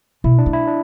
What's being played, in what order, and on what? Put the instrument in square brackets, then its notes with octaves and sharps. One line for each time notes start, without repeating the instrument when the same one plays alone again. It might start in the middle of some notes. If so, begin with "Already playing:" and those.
[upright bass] B2 [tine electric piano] E4
[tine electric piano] D4
[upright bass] A3
[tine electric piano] E4
D4